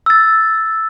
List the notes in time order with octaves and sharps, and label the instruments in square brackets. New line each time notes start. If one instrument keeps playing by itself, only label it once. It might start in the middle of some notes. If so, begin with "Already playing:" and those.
[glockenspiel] E6 A6